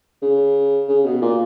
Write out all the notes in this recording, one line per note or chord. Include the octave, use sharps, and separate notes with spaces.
C#3
C#3
B2
A#2